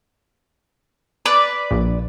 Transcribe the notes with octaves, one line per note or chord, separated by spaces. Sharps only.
B4 D5
A#1